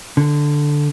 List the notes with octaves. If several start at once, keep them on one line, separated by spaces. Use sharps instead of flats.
D3